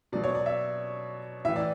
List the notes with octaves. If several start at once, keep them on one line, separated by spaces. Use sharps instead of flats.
B2 F#3 D5
C#5
D5
E5
A2 E3 E5
D5